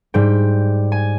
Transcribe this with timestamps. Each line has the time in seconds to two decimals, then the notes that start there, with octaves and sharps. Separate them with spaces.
0.14 G#2 G3 G5
0.92 G#5